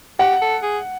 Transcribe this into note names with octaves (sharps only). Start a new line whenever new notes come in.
G4 F#5
A4
G#4